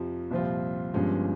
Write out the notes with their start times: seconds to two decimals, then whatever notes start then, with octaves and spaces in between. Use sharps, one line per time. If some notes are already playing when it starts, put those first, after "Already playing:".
Already playing: F2 C3 F3
0.31 C2 A#2 F3 C4 F4
0.94 G1 G2 F3 G#3 C#4